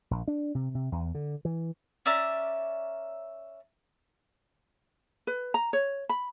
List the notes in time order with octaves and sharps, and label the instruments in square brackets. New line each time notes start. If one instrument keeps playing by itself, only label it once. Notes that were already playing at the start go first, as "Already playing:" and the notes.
[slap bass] A#1
D4
C3
C3
E2
D3
E3
[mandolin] C#4 D5 E5 A#5
[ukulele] B4
A#5
C#5
B5